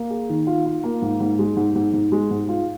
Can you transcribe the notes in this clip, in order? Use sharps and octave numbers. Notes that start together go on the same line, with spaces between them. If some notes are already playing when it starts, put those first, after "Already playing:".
Already playing: A#3
G#4
D#3
F4
F4
A#3
G#2
G#2
G#3
G#2
G#2
G#2
G#3
G#2
F4